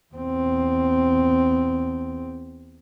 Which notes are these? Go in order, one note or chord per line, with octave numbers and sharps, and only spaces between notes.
E2 C4